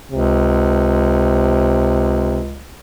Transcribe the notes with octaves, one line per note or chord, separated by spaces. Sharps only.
C#2 C3